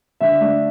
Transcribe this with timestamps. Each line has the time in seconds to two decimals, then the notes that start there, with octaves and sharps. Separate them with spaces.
0.21 D3 E5
0.40 A3 D4